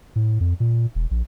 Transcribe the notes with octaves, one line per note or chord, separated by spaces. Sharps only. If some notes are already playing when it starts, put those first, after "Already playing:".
A2
F2
A#2
E1
A#1